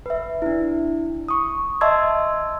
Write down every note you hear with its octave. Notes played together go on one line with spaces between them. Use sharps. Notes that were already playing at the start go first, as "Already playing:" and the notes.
B4 E5
D4 E4
C#6 D#6
D#5 E5 A5 C6 E6 G#6